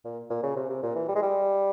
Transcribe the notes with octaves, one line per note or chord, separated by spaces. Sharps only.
A#2
A#2
C#3
C3
C3
A#2
E3
G3
G#3
G3